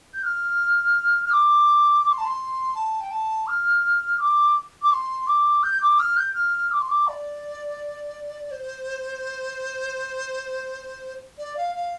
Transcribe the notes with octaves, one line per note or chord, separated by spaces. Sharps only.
G6
F6
F6
D6
D6
C6
A5
C6
A5
G5
A5
F6
D6
D6
C6
D6
G6
D6
F6
G6
F6
D6
C6
D6
D5
C5
D5
F5
F5